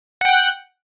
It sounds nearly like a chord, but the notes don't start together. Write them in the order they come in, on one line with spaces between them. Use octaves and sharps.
F#5 G5 F#6